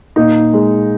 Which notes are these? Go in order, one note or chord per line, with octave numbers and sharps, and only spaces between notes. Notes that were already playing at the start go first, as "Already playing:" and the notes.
A#2 D#4
G#3